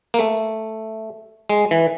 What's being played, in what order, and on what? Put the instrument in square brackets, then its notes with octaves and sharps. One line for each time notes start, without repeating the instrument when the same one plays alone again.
[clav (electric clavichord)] A#3
A3
G#3
E3